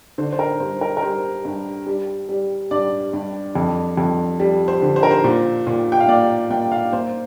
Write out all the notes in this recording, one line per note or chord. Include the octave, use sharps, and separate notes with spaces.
D3 C5
C5
A#4
G2 C5
A#4
A#4
G3 C5
G2
G3
G3
G2 D5
G2
F2
F2
G3
C5
D3
C5
A#4
C5
A#2
A#2
G5
F5
A#3 D5
A#3 G5
F5
A#3 C5